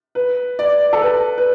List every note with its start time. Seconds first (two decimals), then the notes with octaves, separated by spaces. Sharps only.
0.15 B4
0.59 D5
0.93 A4
1.02 B4
1.38 B4